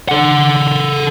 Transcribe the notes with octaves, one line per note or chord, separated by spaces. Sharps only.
A4 F#5